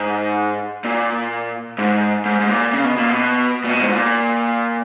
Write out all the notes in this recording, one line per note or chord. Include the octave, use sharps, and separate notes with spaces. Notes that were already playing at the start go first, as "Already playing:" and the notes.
Already playing: G#2
A#2
G#2
G#2
G#2
A#2
C#3
B2
A#2
B2
A#2
B2
G#2
A#2